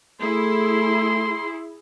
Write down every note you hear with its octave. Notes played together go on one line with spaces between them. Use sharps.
A3 E4 G#4 C6